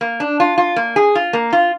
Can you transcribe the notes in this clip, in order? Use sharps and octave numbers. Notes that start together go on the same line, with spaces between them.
A#3
D4
F4
F4
A#3
G#4
F4
A#3
F4